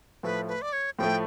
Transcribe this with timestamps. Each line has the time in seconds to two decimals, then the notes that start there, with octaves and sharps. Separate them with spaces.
0.23 A2 F3 A3 B4
0.48 B4
0.62 D5
0.73 C#5
0.99 A2 F3 A3 G5